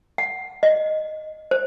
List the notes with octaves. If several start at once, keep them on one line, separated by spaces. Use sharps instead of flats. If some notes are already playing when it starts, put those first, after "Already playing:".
F#5
D#5
C5